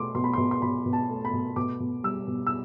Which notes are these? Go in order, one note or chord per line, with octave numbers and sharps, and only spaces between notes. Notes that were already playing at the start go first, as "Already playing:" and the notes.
Already playing: B2 A3 C6 D6
B2 C6
B5
B2 C6
C6
B2 B5
B2
A5
A3
B5
B2
B2 D6
B2
G3 E6
B2
E6